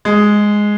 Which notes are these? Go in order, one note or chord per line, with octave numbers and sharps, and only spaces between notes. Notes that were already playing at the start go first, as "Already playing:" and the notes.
G#3